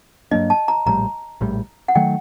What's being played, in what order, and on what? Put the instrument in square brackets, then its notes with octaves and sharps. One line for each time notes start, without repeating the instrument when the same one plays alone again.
[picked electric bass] G2 F#3 A#3 D4 [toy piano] D#5
[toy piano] A5
A#5
[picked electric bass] A#1 A2 G3 [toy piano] A#5
[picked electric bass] A#1 A2 G3
[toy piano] F#5
[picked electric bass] D#3 F#3 A3 [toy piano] G5